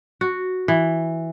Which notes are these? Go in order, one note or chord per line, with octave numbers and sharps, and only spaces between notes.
F#4
E3